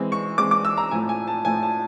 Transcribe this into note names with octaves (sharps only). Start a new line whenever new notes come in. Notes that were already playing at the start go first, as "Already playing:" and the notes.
Already playing: E3 G#3 C4
C#6
E3 G#3 C4 D6
D6
E6
A#5
A2 F3 A3 G#5
G#5
A5
A2 F3 A3 G#5
A5